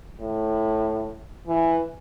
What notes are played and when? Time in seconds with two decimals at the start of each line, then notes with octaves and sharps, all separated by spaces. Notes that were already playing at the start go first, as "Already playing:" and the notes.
0.20 A2
1.47 E3